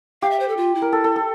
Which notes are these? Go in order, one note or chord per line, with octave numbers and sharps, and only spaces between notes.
G4 F5
E5
C5
A4
F4
E4
A#4
A4
A4
A4